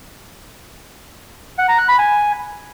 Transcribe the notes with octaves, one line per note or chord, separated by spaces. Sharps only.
F#5
A#5
F#6
B5
G#5